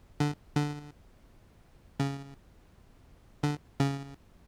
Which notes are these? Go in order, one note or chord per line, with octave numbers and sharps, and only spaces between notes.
D3
D3
C#3
D3
C#3